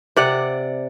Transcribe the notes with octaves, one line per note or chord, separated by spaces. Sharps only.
C3 D5 F#5